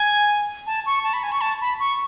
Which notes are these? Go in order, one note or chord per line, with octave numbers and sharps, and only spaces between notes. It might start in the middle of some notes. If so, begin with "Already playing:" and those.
Already playing: G#5
A5
C#6
A5
B5
G#5
C#6
A5
B5
C#6